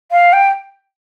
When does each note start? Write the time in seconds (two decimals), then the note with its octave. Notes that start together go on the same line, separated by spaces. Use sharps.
0.11 F5
0.33 G5